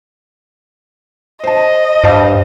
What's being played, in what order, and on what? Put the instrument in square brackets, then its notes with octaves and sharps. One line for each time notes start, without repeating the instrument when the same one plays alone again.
[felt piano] C5 A5 [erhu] D#5
[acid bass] G2 [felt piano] C5 F5 A5